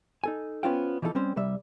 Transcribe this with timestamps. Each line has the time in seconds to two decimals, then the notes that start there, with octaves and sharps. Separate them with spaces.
0.24 D#4 A4 G#5
0.63 B3 C#4 F4 C5 F5 G5
1.02 E3 F3 D#4 E4 A4
1.15 G3 C4 C#4 C5
1.36 C2 G3 E5